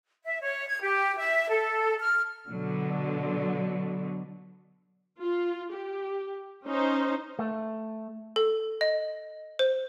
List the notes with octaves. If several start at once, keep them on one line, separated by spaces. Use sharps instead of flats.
E5
C#5
G#6
G4
E5
A4
F6
B2 D3 F#3
F4
G4
C#4 D#4 C5
A3
A4
D#5
C5